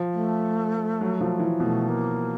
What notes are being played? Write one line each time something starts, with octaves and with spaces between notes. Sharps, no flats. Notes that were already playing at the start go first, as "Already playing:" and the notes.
Already playing: F3
A3
F#3
F3
E3
B2 A3
A#3